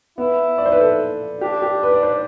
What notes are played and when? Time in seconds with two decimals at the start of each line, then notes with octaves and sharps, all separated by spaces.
0.18 B3 E4
0.58 D5
0.66 C5
0.72 B4
0.80 A4
1.41 D4 G4
1.62 G4
1.83 B4
1.93 D5
2.03 C5